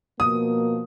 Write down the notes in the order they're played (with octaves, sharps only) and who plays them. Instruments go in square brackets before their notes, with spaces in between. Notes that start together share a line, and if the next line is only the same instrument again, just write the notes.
[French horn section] B2 F3 A#3 [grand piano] D#6